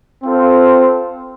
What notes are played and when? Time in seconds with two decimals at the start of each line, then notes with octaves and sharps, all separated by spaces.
0.24 C4 F4 A4 C5